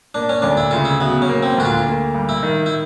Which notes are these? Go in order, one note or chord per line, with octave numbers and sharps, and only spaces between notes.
A#3 D4
C#4
D2 D4
E4
C#3 F4
E4
F#3 B3
C#4
A#3
C4
D2 F#4
F4
A#3
G2
E4
D#3
E4